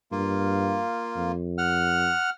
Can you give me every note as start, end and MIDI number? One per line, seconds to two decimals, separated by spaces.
0.12 0.82 43
0.12 1.32 58
0.12 1.32 65
1.16 2.12 41
1.58 2.30 78
1.58 2.30 89